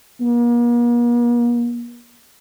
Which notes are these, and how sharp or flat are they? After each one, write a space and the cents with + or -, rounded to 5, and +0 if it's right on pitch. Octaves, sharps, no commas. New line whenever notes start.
A#3 +40